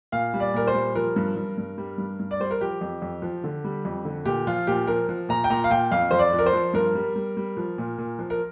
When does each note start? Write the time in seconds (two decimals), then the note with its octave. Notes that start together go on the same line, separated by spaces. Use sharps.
0.12 A#2 F5
0.34 G3
0.40 D5
0.54 A#2 A#4
0.67 C5
0.74 G3
0.95 F3 A#4
1.16 G2
1.36 G2
1.58 G2
1.78 G3
1.98 G2
2.19 G2
2.31 D5
2.40 G3 C5
2.51 A#4
2.61 F3 G4
2.81 F2
3.02 F2
3.22 F3
3.44 D3
3.64 G3
3.85 F2
4.05 D3
4.25 A#2 G4
4.47 F3 F4
4.67 A#2 G4
4.87 F3 A#4
5.09 F3
5.29 A#2 A#5
5.44 G5
5.50 A#2 A#5
5.64 F5
5.70 A#2 G5
5.92 F2 F5
6.11 F2 C5
6.19 D5
6.33 F3
6.39 A#4
6.46 C5
6.53 F3
6.73 G2 A#4
6.95 G3
7.16 G3
7.37 G3
7.57 F3
7.78 A#2
7.98 A#2
8.19 F3
8.30 A#4